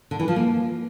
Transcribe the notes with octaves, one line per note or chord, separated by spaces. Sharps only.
D3
E3
F3
A#3